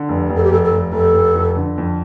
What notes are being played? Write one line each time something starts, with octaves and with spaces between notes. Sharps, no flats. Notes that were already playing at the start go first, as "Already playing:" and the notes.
Already playing: D3
F1
F1
A4
G4
F1 A4
A4
F1
F1 A4
F1
F2
D3
F2